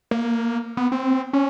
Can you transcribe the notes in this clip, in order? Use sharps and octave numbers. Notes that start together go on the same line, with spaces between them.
A#3
B3
C4
C#4